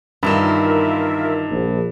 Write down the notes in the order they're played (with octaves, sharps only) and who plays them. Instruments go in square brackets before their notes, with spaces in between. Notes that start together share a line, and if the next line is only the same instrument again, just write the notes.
[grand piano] G2 E7 [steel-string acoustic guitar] D#3 E3 D#4 [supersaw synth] F4 A#4 E5
[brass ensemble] A#1